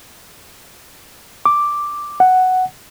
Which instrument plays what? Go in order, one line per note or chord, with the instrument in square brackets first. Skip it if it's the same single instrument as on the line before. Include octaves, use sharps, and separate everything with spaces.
[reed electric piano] D6
F#5